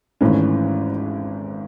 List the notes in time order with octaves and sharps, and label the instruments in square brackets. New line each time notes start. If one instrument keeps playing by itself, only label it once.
[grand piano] G#1 G#2 E3 A3 C#4